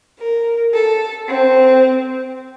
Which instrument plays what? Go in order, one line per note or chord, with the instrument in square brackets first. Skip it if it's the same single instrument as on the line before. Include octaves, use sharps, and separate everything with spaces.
[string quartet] A#4
A4
C4